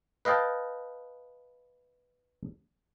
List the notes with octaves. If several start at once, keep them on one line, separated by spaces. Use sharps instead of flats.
B4 D#5 F5 G5 A5